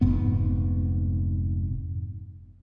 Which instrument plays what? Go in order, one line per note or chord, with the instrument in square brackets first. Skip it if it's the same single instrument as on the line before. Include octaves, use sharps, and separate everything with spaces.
[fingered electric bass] F1 G#2 B3